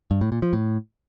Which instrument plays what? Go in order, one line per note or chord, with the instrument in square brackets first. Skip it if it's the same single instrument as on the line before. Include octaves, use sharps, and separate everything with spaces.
[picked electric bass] G2
A2
A#2
F3
A2